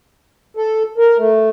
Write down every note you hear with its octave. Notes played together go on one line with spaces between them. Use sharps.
A4
A#4
A3